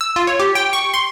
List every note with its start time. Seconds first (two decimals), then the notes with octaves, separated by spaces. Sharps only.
0.01 E6
0.16 F4
0.27 C#5
0.40 G4
0.55 G5
0.73 C#6
0.94 C6